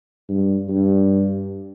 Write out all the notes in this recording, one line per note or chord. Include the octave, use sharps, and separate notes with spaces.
G2
G2